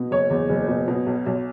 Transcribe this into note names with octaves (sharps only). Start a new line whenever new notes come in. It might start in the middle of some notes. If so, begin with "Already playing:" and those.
Already playing: B2
F#1 C#5
E2
F#1
B2
B2
B1
B1